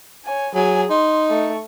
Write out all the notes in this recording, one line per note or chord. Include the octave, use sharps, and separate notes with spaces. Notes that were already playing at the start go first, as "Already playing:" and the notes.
C#5 G#5
F#3 G#4 G#5
D#4 C6
A3 C#6